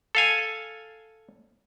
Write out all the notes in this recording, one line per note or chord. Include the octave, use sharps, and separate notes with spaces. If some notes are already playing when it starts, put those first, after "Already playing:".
A4 F5 G#5